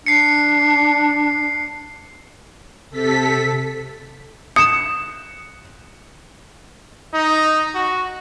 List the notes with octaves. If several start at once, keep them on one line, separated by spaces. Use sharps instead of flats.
D4 C7 C#7
C3 A4 B6
D#6 C#7 E7
D#4
F#4